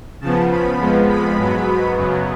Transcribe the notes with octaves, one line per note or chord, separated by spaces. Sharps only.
C#3 F3 B3 A5
B5
F2 F3 G#3 B3
B5
G#2 F#3 B3
F#2 C#3 F#3 B3